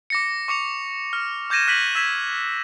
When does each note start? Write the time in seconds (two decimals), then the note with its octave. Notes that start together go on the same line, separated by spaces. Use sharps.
0.10 D6 A#6 C#7
0.48 C#6 D6 C#7 F7
1.13 F6
1.50 D6 G6 G#6 A#6 D#7 E7
1.67 F6 F#6 B6 D#7 F#7
1.95 E6 G#6 B6 E7